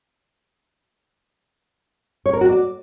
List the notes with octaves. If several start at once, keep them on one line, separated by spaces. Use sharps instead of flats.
C#5
A#4
F#4
D5